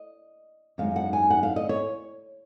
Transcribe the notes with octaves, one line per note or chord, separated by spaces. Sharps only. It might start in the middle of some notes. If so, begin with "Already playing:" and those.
Already playing: D#5
F#2 D#3 G#3 D#4 F5
F#5
G#5
F#5
F5
D#5
C#5